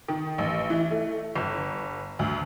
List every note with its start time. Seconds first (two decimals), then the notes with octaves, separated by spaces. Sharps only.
0.08 D#3
0.38 A1
0.70 E3
0.91 A3
1.36 G1
2.19 D2